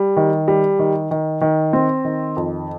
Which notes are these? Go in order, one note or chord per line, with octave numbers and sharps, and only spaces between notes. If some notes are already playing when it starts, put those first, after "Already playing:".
Already playing: G3
D#3
G3
D#3
D#3
D#3
C4
D#3
F2